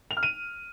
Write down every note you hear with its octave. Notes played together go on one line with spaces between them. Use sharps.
F7
F6
D#7